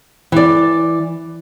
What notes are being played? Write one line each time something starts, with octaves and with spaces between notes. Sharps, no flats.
E3 D5